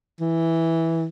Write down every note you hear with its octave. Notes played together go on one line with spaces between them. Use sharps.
E3